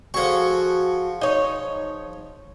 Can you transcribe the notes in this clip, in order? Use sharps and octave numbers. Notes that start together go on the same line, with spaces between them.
F3 F#4 G#4 A4 C#6
D#4 C#5